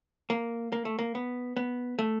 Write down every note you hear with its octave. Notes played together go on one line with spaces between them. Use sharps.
A#3
A#3
A3
A#3
B3
B3
A3